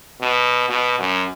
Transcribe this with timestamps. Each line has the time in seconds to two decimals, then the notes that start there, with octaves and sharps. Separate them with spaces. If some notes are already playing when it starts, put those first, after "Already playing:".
0.21 B2
0.70 B2
1.00 F#2